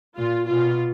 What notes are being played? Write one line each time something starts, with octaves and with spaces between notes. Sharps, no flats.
A#2 F4
B2 F4